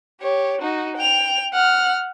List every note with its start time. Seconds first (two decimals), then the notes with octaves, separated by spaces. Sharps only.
0.21 G4 C#5
0.61 D#4 F#4
0.97 G5 F7
1.53 F#5 F6